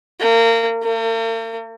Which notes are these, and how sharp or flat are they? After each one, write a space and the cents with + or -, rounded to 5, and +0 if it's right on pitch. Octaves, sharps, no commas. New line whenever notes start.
A#3 -30
A#3 -45